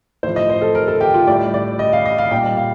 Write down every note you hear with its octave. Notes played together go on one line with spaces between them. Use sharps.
A2 F3 C5
D#5
C5
A4
A#4
A4
G4
F4
A2 G3 D5
D5
D#5
F5
D#5
F5
A#2 G3 G5
F5